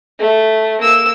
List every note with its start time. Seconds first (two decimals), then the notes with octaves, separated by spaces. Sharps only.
0.19 A3
0.81 A#3 E6